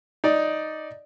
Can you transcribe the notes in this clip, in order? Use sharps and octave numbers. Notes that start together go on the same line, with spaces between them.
D#4 D5